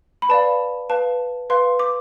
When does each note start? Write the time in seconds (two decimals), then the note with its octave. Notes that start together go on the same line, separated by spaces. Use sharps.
0.22 B5
0.29 B4 D5 F5 A5
0.90 B4 F5 A5
1.50 B4 F5 C6
1.79 D6